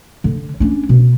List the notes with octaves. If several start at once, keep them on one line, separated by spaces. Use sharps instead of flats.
D3
C#4 D4
B2